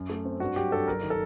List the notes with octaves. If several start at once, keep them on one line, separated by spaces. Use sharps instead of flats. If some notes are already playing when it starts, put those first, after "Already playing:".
Already playing: F#2
A3
C4
G2 F#4
F#3 G4
G2 A4
F#1 A#4
D#3
A4